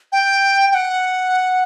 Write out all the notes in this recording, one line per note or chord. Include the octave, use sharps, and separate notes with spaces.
G5
G5
F#5